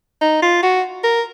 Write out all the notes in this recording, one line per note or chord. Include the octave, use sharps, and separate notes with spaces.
D#4
F4
F#4
A#4